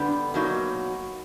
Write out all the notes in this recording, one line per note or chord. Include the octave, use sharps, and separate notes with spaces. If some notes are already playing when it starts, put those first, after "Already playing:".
Already playing: D3 G3 B3 D4 G4
B2 F#3 A#3 D#4 F#4